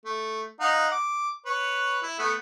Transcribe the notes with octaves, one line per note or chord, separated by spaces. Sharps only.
A3
D#4 F5 F#5
D6
B4 C#5
E4
A3 B3